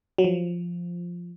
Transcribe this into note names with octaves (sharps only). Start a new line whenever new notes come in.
F#3
F3